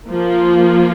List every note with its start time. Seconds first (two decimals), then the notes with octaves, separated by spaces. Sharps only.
0.11 F3 A#3 F4